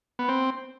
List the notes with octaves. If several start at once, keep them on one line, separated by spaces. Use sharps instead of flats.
B3
C4